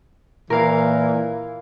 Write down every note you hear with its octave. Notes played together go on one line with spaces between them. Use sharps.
A#2 E3 A#4 F5